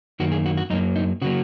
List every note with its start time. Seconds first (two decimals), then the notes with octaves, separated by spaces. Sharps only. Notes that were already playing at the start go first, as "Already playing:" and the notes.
0.20 F#2 D#3 A#3 F#4
0.32 G#4
0.46 F#4
0.57 F#4
0.70 F#2 F#3 A#3 D#4
0.96 D#4
1.22 C#3 F#3 A#3 F#4